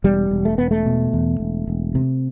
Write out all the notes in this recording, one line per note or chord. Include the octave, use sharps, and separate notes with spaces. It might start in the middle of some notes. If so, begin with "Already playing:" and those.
E1 G3
E1
A3
E1 B3
A3
B2
E2
E1
E1
C3